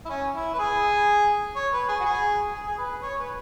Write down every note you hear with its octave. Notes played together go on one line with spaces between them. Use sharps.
E4
C#4
E4
B4
G#4
C#5
B4
G#4
F#4
G#4
G#4
G#4
B4
C#5
B4